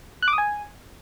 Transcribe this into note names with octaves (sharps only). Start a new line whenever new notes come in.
F#6
D6
D#6
G#5